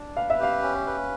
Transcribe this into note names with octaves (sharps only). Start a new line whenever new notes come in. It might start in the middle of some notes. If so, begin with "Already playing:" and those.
Already playing: D4
B4 F5
E5
G4 F5
C#4
B4